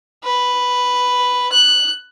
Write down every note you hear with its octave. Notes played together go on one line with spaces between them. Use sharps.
B4
F#6